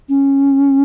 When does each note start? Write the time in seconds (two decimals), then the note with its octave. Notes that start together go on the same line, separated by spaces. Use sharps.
0.09 C#4